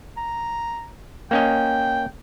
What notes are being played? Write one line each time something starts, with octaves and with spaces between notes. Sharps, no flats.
A#5
A#3 C#4 D#5 G5